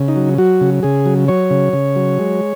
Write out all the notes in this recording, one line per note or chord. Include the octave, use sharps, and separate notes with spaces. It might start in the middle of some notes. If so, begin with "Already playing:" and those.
Already playing: C#3
D#4
F#3
F#3 F#4
C#3
C#3 G#4
F#3
F#3 C#5
C#3
C#3
F#3
G#3